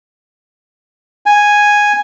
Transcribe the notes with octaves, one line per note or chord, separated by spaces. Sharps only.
G#5